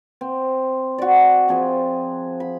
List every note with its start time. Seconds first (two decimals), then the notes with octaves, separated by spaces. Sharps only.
0.21 C4
0.98 F#4 D5
1.48 F3 C4 G#4
2.40 B5